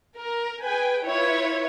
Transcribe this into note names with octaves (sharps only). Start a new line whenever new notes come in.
A#4
G#4 B4 G5 G#5
E4 F4 B4 C#5